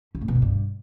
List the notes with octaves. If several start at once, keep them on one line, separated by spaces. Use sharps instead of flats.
C#3
A2
B2
D3
G2